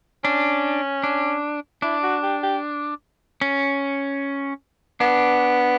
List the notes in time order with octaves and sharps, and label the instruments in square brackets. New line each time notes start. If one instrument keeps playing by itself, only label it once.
[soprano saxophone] C#4 [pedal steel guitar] D4
[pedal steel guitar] D4
[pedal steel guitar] D4 [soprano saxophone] E4
[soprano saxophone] F#4
G4
G4
[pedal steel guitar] C#4
[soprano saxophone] B3 [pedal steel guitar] D4